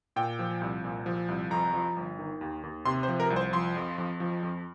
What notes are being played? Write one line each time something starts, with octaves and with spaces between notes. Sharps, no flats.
A#2 G5
F3
C2
A#2
F3
C2
F2 A#5
F3
G1
D#3
D#2
D#2
C3 C6
C5
F3
A#4
C2
C5
F3 C6
F2
F2
F3
F2